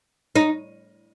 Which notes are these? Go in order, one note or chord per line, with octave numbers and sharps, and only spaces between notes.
D#4